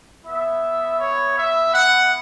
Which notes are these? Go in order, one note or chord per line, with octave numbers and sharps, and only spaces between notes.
B3 E4 E5
C#5
E5
F#5